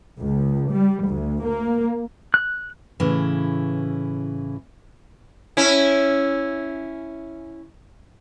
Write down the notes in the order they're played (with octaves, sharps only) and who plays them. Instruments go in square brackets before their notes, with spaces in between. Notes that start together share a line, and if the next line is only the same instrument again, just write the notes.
[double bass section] C#2
G3
D2
A#3
[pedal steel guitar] F#6
[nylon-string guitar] A2 C#3 E3
[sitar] C#4 E4